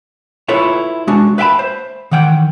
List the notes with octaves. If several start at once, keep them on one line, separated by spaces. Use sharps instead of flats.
E4 F4 A4 B4 C#5
G#3 D4 F#4
B4 E5 F5 G5 A5 B5
C5
D#3 E3 F#5 G5